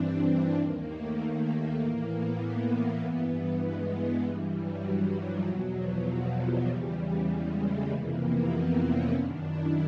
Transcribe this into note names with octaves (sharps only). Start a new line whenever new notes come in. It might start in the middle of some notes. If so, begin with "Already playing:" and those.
Already playing: G2 E3 C4 D4
D#2 D#3 A#3
A3
A3
A2 E3 A#3
B3
G2 E3 B3
G#3
G2 E3 G3
F#3
F#3
F3
E2 B2 F#3
F3
F#3
G3
E2 C#3 E3
G#3
A3
F2 C3 E3 A#3
B3
C4
C#4
F#2 D#3 D4
E4